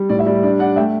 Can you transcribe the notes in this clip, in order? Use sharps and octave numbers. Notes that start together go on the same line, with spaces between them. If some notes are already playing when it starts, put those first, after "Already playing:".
Already playing: G3
A2 D5
E5
G3 D5
D4 D5
D4 D5 F#5
A3 E5 G5